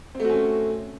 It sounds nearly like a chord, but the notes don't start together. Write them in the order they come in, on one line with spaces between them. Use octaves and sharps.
C4 A3 F#4 C#4